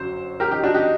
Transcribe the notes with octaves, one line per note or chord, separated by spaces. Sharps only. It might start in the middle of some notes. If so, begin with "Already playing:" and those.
Already playing: G1 F#2 F#3 C5
G4 A#4
D#4 G4
D4 F#4
D#4 G4